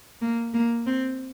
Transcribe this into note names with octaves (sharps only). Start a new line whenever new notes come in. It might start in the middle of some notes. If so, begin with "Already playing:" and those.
A#3
A#3
C4